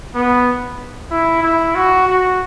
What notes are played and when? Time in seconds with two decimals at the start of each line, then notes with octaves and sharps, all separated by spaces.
0.15 B3
1.11 E4
1.43 E4
1.75 F#4
2.07 F#4